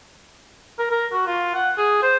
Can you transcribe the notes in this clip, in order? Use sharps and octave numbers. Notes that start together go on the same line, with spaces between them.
A#4
A#4
F#4
F4
F#5
G#4
C5